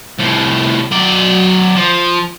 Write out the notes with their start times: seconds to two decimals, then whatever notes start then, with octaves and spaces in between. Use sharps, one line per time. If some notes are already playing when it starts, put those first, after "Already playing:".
0.19 C2 A2
0.91 F#3 D5
1.76 F3